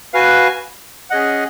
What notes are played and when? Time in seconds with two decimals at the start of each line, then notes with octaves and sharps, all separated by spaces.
0.14 F#4 B4 F5 G#5
1.10 C#4 G#4 D#5 F#5